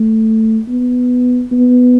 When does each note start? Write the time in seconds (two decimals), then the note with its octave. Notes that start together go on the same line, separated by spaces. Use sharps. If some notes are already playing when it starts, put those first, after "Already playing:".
Already playing: A3
0.68 B3
1.52 B3